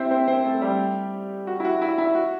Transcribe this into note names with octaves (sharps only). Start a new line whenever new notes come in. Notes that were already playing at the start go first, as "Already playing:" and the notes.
Already playing: C4 E4 G4 C5 E5
C4 C5
C4 C5
A3 A4
G3 G4
F#4
E4
F#4
E4
E4
F#4